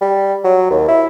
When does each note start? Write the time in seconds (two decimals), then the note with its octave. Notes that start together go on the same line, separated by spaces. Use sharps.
0.01 G3
0.44 F#3
0.70 D#2
0.88 E4